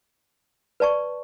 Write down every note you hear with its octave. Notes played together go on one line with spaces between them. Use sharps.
B4 D5 A5 C#6